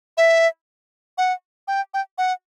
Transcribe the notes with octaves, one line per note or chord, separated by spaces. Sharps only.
E5
F#5
G5
G5
F#5